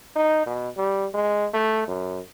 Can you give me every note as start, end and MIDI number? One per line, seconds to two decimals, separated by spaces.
0.15 0.45 63
0.46 0.69 47
0.77 1.07 55
1.14 1.47 56
1.54 1.86 57
1.87 2.20 42